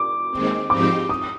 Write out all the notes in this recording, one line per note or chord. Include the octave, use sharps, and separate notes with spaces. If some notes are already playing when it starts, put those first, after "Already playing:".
Already playing: D6
D#2 D#3 G#3 C4
G#2 F3 C4 D#4 G4 D6
D#6